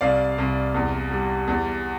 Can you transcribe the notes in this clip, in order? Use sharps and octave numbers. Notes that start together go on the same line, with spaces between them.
C2 D5 F5
C2
E2
G3
E2